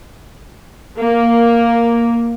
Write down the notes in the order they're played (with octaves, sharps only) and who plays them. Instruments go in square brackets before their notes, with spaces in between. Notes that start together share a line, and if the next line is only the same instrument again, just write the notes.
[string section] A#3